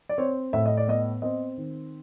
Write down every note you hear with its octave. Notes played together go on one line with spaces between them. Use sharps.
D5
C4 C#5
A2 E5
D#5
D5
B3 D#5
C4 D#5
D#3